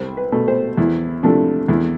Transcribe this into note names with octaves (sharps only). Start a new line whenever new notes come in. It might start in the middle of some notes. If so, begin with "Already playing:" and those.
Already playing: C2 C5
B4
B2 A3
C5
E2 E4
C3 F3 A3 D4
E2 E4